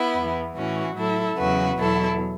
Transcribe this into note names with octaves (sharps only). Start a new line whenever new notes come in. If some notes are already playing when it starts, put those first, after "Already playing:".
Already playing: B3 E4
E2
E3
A2 E3 C#4 F#4
A2 F#3 E4 A4
E2 C#3 F#3 F#4 B4
E2 B2 F#3 E4 A4